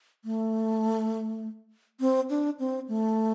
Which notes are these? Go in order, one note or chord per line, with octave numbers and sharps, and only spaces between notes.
A3
C4
D4
C4
A3